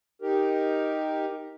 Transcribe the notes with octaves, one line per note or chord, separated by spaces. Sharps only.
D#4 G4 A#4